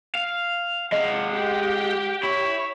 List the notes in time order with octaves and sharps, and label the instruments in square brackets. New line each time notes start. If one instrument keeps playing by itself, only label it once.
[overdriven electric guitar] F5
[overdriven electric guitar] G#3 F5 [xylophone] D#5 [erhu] F#5
[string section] G4
[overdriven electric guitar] E4 [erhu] C#5